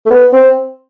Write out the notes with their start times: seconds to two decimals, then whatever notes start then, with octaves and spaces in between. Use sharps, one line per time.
0.06 A3
0.11 B3
0.33 C4